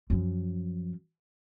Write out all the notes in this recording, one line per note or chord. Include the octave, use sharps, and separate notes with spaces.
F#2 F3